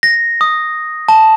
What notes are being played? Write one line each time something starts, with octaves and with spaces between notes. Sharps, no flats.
A#6
D#6
A5